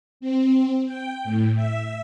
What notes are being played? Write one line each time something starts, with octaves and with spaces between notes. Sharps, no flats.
C4
G5
A2
E5